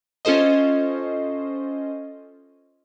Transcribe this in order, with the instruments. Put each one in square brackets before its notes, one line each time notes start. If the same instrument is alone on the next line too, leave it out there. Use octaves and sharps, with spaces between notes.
[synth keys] C#4 F4 A4 C5 D#5